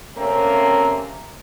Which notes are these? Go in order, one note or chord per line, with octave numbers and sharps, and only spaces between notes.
C3 A3 A#3 C4 C#4